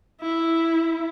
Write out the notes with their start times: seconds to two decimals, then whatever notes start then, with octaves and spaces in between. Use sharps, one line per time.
0.21 E4